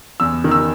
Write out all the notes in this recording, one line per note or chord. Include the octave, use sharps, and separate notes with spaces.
E2 E6
D#3
E6